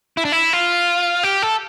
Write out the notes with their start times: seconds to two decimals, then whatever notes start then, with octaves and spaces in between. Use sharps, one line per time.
0.17 E4
0.25 D4
0.32 E4
0.53 F4
1.23 G4
1.42 A4